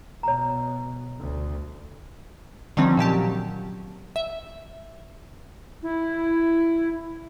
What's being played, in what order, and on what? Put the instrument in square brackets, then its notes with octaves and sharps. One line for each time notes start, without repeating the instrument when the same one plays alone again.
[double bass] B2 [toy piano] C#5 A#5
[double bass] D2
[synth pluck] D3 D#3 F3 G3 C4 C#4
A#2 F#3 G4 A5
E5
[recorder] E4